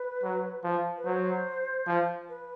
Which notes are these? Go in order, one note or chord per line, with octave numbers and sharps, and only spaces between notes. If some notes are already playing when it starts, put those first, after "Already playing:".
Already playing: B4
F#3
F3
B4
F#3 C5
F3
B4